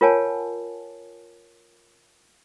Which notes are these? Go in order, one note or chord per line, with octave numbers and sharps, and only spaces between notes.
F4 A#4 C#5 F#5 G#5 A5